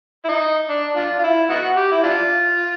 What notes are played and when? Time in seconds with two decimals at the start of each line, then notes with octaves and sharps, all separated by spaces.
0.25 E4
0.28 D#4
0.69 D4
0.96 D4 F4
1.19 F4
1.24 E4
1.50 B3 D#4 F#4
1.77 G4
1.92 E4
2.03 D4 F4